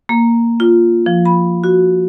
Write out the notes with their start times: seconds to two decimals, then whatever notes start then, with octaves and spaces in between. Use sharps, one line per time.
0.09 A#3
0.60 F4
1.06 F3
1.25 B5
1.64 F#4